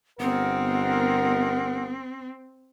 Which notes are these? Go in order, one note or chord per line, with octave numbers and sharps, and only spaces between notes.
G1 B3 C4 A#4 F#5